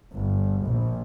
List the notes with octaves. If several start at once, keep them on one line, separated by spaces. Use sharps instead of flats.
G1
A#1